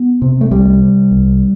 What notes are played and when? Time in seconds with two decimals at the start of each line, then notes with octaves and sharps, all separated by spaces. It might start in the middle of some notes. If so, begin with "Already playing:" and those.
Already playing: B3
0.22 C3
0.41 A3
0.51 C2 G3
0.81 C3
1.11 C2